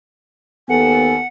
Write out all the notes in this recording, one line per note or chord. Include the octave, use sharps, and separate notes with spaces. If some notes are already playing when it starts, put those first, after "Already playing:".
D#2 B3 A4 F#5 G#5